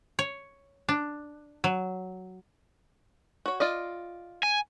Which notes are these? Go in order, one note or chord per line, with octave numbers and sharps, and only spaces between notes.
C#5
D4
F#3
F#4 C#5
F4 D5 D#5
G#5